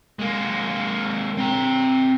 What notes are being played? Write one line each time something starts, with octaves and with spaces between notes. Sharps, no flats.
G#3 A#3
C4 A#5